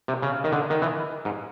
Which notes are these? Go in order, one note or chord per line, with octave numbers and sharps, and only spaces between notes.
C3
C#3
D#3
D3
D#3
E3
G#2